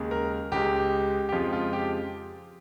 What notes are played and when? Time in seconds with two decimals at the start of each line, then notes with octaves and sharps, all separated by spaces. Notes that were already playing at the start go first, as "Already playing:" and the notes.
Already playing: D#2 C#3 G#3
0.11 A#4
0.52 C#2 C#3 G#3 G4
1.29 G4
1.32 F2 C#3 F3 G#3 F4
1.53 F4
1.73 G4